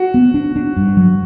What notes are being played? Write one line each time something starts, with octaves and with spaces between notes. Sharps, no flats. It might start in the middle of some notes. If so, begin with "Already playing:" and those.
Already playing: F#4
B3
D4
D4
G2
F#3